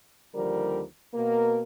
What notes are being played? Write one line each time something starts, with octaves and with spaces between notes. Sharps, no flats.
D#2 D3 F3 G3 A#4
B2 A#3 A#4